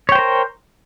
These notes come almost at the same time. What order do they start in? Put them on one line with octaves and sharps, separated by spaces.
C#5 G5 C5 A#4